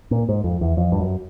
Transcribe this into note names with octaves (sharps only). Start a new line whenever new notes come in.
A#2
G#2
F2
E2
F2
G2
F#2